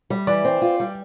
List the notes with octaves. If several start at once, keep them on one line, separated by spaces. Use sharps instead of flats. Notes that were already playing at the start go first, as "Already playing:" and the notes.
G3
E3 D5
C4
F4
G3